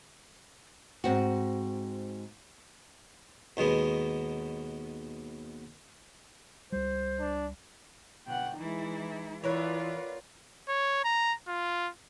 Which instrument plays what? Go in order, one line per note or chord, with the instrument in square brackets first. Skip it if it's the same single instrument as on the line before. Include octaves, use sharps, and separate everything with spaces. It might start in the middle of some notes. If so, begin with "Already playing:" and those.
[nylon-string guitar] G#2 C4 F#4
[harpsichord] D#2 B2 G#3 B3
[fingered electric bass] C#2 G3 [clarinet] C5
[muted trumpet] D4
[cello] B2 D3 [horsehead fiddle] F#5 G5
[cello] E3 E4 [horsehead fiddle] G#3 D#4
[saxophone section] E3 [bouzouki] B3 A#4 C#5 [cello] F4 [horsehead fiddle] B4 D5
[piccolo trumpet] C#5
A#5
F4